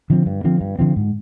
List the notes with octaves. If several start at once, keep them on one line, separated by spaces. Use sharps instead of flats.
D3 F3 C4
G2
D3 F3 C4
G2
D3 F3 C4
G#2